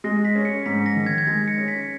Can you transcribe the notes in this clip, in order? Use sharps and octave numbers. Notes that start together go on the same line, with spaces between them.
G#3 A#6
B6
C#4
C#7
G#2 B6
A#6
D#3
G#6
G#6
G#3 A#6
C#7
C#4
B6